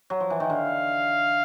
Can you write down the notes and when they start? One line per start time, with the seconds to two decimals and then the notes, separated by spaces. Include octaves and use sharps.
0.10 F#3
0.20 F3
0.30 E3
0.40 D#3
0.50 D3 F5